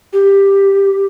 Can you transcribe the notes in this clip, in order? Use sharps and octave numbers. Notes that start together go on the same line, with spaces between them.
G4